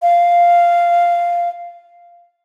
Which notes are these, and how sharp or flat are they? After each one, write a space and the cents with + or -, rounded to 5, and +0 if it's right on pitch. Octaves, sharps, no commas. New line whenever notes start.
F5 -5